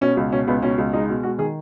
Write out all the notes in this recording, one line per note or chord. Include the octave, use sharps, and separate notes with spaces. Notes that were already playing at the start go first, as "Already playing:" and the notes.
B2 C#4
C#2
B2 C#4
C#2 B3
B2 C#4
C#2
G#3 D#4
B2
G#3 F#4
D#3 G#4